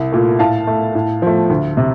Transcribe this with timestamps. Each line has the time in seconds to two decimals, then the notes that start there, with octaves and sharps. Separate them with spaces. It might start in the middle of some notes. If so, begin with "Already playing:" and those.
Already playing: C2
0.12 A#2 A3
0.39 A2 F5 A5
0.67 A3
0.95 A2
1.22 F3 A3
1.50 D2
1.77 C3